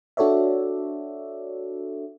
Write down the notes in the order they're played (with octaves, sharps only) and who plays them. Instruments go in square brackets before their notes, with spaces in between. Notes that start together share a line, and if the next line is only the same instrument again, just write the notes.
[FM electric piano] D4 F#4 A4 C#5 D5 E5